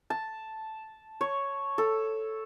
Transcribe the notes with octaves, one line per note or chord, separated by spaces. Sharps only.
A5
C#5
A4